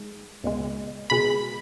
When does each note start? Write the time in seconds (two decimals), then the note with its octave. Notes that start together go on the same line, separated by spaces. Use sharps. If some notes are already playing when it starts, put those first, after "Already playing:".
Already playing: G#3 D#4
0.44 C#2 B2 G#3
1.10 B2 G#3 B5